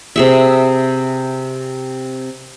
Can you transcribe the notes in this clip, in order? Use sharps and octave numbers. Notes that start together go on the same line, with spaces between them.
C3 G#4 E5